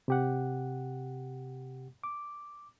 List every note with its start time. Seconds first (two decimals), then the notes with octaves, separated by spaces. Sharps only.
0.08 C3 G4 F#5
2.04 D6